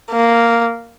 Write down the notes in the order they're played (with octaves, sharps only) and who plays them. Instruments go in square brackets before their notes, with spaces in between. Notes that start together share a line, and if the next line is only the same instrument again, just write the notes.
[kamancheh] A#3